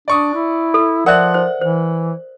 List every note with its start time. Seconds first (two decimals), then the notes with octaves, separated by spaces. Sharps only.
0.08 D4 D5 C#6 D#6
0.34 E4
0.74 A4
1.06 F3 A#4 D5 E5 F#5 F#6
1.34 C5
1.61 E3 C5